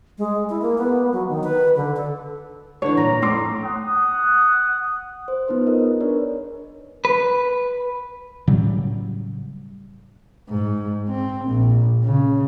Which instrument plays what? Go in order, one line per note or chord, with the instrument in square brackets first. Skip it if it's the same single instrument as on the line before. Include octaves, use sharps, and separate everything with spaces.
[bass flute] G#3
E4
A#3
B3
F#3
D#3
B4
D3
A4
[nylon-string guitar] D3 E3 [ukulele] C#5
[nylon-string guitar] A#2 [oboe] A#5
[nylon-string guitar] F2 [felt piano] A2 C6 D6
[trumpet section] F#5 D#6
[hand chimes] C5
B3 D#4 F4 B4 C5
G#4 A#4 D#5
D4 A#4 B4 C#5 D5
[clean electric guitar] B4
[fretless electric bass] A2 C#3 F#3 G3
[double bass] G#2
C4
A#1
C#3